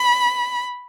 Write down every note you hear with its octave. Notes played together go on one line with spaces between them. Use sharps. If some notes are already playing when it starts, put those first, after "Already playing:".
Already playing: B5